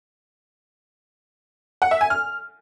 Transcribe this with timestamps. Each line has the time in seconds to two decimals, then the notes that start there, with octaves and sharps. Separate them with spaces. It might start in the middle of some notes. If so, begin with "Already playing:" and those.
1.82 F#5
1.91 E5
2.01 G#5
2.10 F6